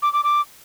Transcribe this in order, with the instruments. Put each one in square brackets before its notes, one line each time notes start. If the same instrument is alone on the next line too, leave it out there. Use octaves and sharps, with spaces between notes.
[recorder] D6
D6
D6